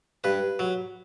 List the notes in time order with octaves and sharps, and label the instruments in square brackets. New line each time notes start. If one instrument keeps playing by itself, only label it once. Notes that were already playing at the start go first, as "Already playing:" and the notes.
[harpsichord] G2 B4
F#3